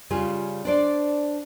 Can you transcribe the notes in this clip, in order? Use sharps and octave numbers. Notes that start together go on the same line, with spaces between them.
C#3 G3 F4 G4 G#4
D4 C5 D5